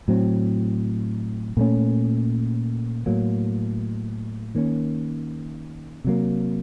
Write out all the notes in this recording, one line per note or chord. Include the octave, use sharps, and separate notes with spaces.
A2 F#3 C4
A#2 A3 C#4
A2 F#3 A#3
D#3 A#3 C#4
C3 F#3 A#3